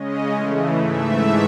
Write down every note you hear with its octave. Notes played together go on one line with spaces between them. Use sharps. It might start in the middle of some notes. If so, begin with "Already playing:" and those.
Already playing: C#3 G#3 C#4 D#5
C#3 E3 A3
G#2 E3 A3 E5